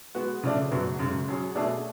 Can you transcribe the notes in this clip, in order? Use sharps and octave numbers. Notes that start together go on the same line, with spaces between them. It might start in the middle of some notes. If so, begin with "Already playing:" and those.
G#3 B3 F#4
C#3 F3 A3 D4
F#2 C#3 F#3 B3 F#4
F#2 C#3 G#3
F#3 C#4 G#4 C#5
B2 A3 D4 G#4